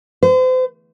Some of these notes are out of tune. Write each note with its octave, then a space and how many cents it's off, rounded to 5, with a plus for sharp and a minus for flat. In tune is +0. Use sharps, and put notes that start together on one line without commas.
C5 -40